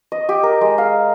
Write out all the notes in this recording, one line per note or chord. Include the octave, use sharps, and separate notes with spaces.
D#5
G4
A#4
G#3
F5